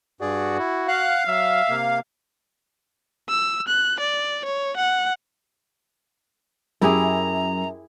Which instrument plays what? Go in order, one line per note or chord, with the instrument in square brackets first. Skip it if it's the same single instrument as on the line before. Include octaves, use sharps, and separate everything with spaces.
[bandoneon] G2 G#4 D5 [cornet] F#4
[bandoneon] E4
[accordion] F5 [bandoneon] F#5 F#6
[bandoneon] F#3 [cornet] E5
[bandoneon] C3 A#3
[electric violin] E6
F#6
D5
C#5
F#5
[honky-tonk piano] F#2 [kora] E4 G4 G#4 [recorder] A#5